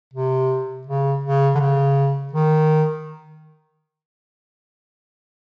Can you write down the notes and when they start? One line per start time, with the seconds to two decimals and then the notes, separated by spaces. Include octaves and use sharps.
0.14 C3
0.87 C#3
1.24 C#3
1.55 D3
1.60 C#3
2.33 D#3